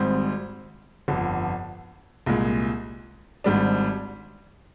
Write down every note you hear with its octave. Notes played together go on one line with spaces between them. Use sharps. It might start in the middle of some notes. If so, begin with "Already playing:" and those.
Already playing: G#1 G#2 G3 C4
G1 F2 D3
C2 A#2 G#3
G#1 G#2 G3 D4